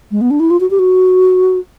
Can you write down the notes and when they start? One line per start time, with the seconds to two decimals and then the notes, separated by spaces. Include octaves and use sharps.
0.11 G#3
0.21 B3
0.31 D4
0.40 E4
0.50 F4
0.60 F#4
0.70 G4
0.79 F#4